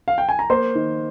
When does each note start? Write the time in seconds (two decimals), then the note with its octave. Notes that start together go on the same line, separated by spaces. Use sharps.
0.08 F5
0.18 G5
0.29 G#5
0.39 A#5
0.50 A#3 C5 C6
0.75 D#3